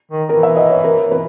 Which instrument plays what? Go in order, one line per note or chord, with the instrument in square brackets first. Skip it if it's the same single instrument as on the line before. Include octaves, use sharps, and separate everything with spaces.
[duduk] D#3
[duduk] E3 [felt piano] A#4
[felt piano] E5
D#5
C#5
A#4
B4